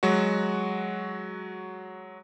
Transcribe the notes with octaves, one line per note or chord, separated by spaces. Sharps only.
F#3 G#3 F#4